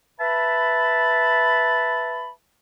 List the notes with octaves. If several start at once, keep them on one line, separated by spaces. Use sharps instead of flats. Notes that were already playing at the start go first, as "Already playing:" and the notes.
B4 E5 A5 B5